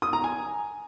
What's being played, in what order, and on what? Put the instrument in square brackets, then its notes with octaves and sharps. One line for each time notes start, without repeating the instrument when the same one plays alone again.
[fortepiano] D#6
A#5
G#5